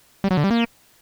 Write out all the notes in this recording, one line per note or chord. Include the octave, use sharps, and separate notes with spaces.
G3
F#3
D3
G3
A#3